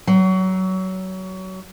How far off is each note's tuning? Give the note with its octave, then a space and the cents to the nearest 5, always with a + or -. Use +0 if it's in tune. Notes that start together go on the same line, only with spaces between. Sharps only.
F#3 +25